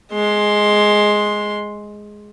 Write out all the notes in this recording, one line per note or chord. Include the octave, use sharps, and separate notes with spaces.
G#3 C6